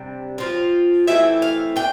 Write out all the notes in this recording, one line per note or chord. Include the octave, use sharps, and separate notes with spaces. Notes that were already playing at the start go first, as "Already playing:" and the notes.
Already playing: C3 G3 D4
F3 C4 F4
E3 A3 C4 E4 E5
F5
D4 G5